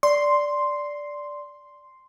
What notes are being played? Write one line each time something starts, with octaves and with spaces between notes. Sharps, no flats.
D5 C6